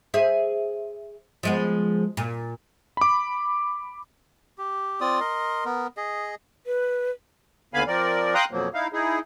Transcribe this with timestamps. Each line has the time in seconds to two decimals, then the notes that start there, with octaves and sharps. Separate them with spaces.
0.14 G#4 C5 E5
1.43 F3 G#3 B3
2.17 A#2
2.97 B5 D6
4.58 G4
5.01 C4 F4 D5 D#6
5.20 A#4 D#5 C6
5.65 B3 A#4
5.97 G#4 D#5
6.66 B4
7.74 D#2 D3 B3 F5 G#5 B5
7.87 F3 C4 A#4 D5
8.34 F5 G5 A#5 C6 D#6 F#6
8.51 F2 B2 F3 F#3 A#3
8.74 D#4 E4 F5
8.93 D#4 E4 G#4